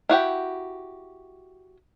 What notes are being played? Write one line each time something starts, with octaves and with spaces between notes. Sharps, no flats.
E4 F#4 G4 G5